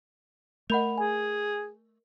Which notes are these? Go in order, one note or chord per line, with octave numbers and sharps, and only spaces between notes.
A3 A#4 D#5 F#5 B5 F7
G#4 G#5